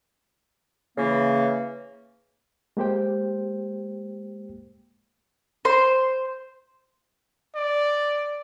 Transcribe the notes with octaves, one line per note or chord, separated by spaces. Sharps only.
C#3 E3 A#3
G#3 A#3 G4 C5 G5
C5 C6
D5